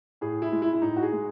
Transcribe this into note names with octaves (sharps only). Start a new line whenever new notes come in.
A2 G#4
E4
G#3
E4
E4
A2 D#4
F#4
G#4
G#3